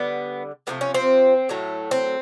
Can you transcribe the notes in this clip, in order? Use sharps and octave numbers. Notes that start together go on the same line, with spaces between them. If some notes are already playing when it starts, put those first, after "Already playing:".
Already playing: D3 G3 B3
C3 F3 A3 B3
C#4
C4
A2 F#3 A3
C4